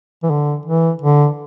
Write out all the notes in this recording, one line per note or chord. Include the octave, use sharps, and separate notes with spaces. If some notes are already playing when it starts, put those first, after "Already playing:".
E3
D3
E3
D3